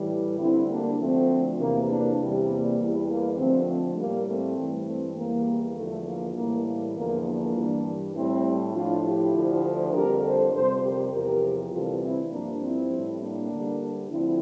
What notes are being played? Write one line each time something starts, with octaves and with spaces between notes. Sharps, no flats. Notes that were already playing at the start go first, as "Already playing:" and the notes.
Already playing: A2 E3 G3
D2 D3 G3 C4 E4
A#3 D4
D2 D3 F3 A3 C4
E2 C3 E3 A#3
A#3 D4
E2 C3 E3 G3
A#3
E2 E3 G3
A#3
F2 D3 F3 A3 C4
A3 C4
A2 G3 A#3
A3 C4
G2 E3 G3
A3 C4
E2 E3 G3 A#3
E2 D3 F3 A3
A#3
A2 E3 G3 A#3
A#3
E2 D3 F3 A#3
A#3 D4
G2 E3 G3
A2 G3 C4 E4
A2 F3 D4 F4
E4 G4
D2 D3 F3
F2 D3 G3 G4 A#4
A4 C5
F2 C3 G3 A4 C5
G4 A#4
E2 C3 F3 G4 A#4
D2 C3 E3 G3 F4 A4
C4 E4
G2 F3 A#3 D4
C4 E4
A2 G3
A#3 D4
D2 D3 G3
D2 D3 F3 C4 E4